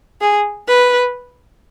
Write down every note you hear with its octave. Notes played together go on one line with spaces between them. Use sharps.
G#4
B4